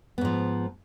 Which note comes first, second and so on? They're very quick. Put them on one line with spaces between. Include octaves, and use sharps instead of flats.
B3 G#2 F3